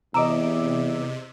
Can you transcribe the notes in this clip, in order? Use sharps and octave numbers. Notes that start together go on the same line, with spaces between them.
E2 C3 D#5 A#5 D6 E6